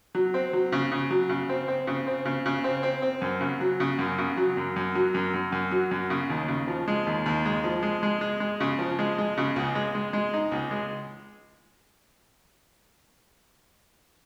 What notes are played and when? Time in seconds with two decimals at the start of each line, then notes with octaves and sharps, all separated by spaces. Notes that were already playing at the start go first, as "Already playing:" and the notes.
0.15 F#3
0.34 C4
0.53 F#3
0.72 C#3
0.92 C#3
1.11 F#3
1.29 C#3
1.49 C4
1.68 C4
1.87 C#3
2.07 C4
2.25 C#3
2.46 C#3
2.64 C4
2.83 C4
3.02 C4
3.22 F#2
3.41 C#3
3.61 F#3
3.80 C#3
3.99 F#2
4.18 C#3
4.37 F#3
4.57 F#2
4.76 F#2
4.95 F#3
5.14 F#2
5.34 F#2
5.52 F#2
5.71 F#3
5.91 F#2
6.10 C#3
6.30 D#2
6.48 C#3
6.68 F3
6.88 G#3
7.07 D#2
7.26 D#2
7.45 G#3
7.64 F3
7.83 G#3
8.03 G#3
8.21 G#3
8.40 G#3
8.60 C#3
8.79 F3
8.99 G#3
9.18 G#3
9.38 C#3
9.56 C#2
9.75 G#3
9.95 G#3
10.13 G#3
10.34 D#4
10.52 C#2
10.71 G#3